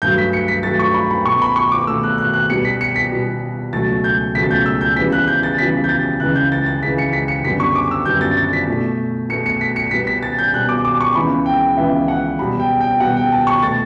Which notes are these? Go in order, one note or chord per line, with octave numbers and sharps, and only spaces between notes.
G2 F#3 A3 G6
B6
C#7
B6
G2 F#3 A3 A6
C#6
B5
B5
B2 A3 C#6
B5
C#6
D6
B2 A3 E6
F#6
F#6
F#6
B2 G3 B3 C#7
B6
C#7
B6
B2 G3 B3
C#2 B2 F#3 A3 A6
G6
C#2 B2 F#3 A3 B6
A6
G6
E6
G6
E2 C#3 E3 G3 B6
F#6
G6
A6
E2 C#3 E3 G3 B6
G6
A6
C#2 C#3 E3 F#6
G6
A6
A6
C#2 C#3 E3 B6
C#7
B6
C#7
F#2 D3 G3 B3 B6
C#6
D6
E6
F#2 D3 G3 B3 G6
A6
A6
B6
B2 A3
B2 A3 C#7
C#7
B6
C#7
B2 G3 B3 B6
B6
A6
G6
B2 G3 B3 F#6
D6
D6
C#6
C#2 C#3 E3 B3 B5
G5
C#2 C#3 E3 B3 E5
F#5
E2 B2 G3 B5
G5
G5
E2 B2 G3 F#5
G5
A5
C#6
B2 A3 A6